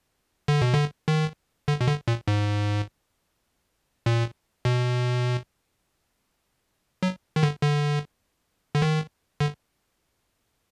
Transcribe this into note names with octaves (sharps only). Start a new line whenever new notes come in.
D3
B2
D3
D#3
D3
B2
D3
A#2
G#2
A#2
B2
F#3
D#3
D3
D3
D3
D#3
D3